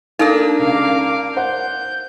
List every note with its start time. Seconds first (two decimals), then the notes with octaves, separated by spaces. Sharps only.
0.19 A#3 D4 D#4 A4
0.59 C#2 F5 D6
1.36 C5 F#5 G6